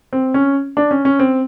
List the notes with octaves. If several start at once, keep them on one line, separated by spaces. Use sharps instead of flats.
C4
C#4
D4
C#4
C#4
C4